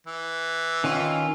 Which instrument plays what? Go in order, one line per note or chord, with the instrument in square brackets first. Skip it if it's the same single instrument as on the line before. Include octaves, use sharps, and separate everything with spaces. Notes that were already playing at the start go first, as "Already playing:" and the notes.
[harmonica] E3
[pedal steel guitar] D#3 C#4 F4